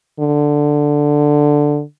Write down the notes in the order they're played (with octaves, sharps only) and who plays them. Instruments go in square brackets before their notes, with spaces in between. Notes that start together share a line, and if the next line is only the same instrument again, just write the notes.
[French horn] D3